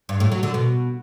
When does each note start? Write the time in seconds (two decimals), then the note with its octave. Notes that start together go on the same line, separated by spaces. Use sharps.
0.09 G2
0.20 A2
0.32 F#3
0.43 D3
0.54 B2